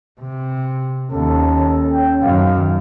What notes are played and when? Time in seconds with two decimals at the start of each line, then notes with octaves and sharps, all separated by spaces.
0.20 C3
1.12 D#2 C#4 A4
1.92 G5
2.23 F#2 D#3 F5